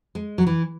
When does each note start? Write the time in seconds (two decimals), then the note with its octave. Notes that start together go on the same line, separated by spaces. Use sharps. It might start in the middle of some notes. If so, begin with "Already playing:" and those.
0.15 G#3
0.38 F#3
0.47 E3